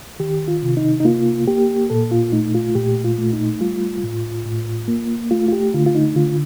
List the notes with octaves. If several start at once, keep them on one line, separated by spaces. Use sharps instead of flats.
D#3 G4
F4
C3
D#4
D#4
A#3 F4
A#3 G4
A#2 A4
F4
A3 D#4
F4
A#2 G4
F4
A3
D#4
G3 F4
A2
A2
A#3
A3 F4
F4
G4
D3 F4
F4
D#4
D3 F4